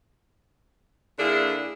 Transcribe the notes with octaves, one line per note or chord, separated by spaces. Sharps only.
D3 A#3 D4 E4 G#4